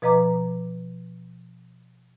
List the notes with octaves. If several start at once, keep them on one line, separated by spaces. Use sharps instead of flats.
B2 F3 B4 D#5 A#5 D6